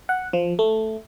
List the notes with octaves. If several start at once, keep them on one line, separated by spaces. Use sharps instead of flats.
F#5
F3
A3